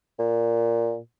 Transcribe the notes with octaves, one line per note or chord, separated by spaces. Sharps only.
A#2